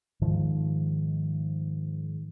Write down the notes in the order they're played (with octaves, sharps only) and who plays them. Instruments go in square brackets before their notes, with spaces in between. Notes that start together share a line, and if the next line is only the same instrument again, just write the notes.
[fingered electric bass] G#2 D#3 F3